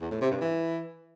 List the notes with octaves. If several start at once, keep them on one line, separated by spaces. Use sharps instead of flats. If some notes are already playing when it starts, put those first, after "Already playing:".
E2
A2
C3
G2
E3